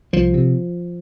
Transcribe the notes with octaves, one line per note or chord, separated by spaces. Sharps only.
C2 F3
C3